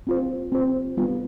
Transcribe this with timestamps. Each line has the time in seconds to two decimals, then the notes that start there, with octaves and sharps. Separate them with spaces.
0.07 C4 F4 C5
0.52 C4 F4 C5
0.97 G3 B3 F4 B4